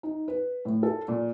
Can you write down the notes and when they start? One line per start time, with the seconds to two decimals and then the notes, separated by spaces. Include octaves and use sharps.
0.03 D#4
0.28 B4
0.65 A2
0.83 A4
1.08 A#2